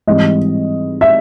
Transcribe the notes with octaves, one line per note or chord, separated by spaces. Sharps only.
G#2 E3 G3 C4 D#5
E5